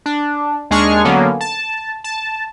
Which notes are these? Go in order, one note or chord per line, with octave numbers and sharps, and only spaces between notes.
D4
D#2 G#3 D4 G#4 C#6 F6
D3 F#3 A#3 B3 C#4
A5
A5